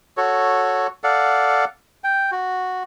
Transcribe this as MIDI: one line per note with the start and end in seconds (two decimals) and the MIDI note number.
0.17 0.87 66
0.17 0.87 69
0.17 0.87 73
1.04 1.65 69
1.04 1.65 74
1.04 1.65 77
1.04 1.65 78
2.04 2.31 79
2.32 2.83 66